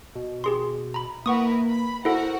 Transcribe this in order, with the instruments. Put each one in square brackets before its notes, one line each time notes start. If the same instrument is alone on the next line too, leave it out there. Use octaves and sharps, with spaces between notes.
[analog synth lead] B2
[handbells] G4 G#4 C6
A#5 B5
[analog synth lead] A#3 [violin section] E4 A#4 B4 [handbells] F#5 C#6 D#6
[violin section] B5
[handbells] E4 A4 [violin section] F#4 A#4 F#5 [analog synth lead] C5